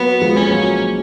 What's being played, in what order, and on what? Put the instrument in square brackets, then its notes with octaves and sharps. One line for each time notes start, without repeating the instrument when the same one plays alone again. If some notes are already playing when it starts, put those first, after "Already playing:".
Already playing: [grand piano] F#3 A#3 [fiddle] B3
[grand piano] F3 G#3
[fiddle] C#4
[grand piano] F#3 A#3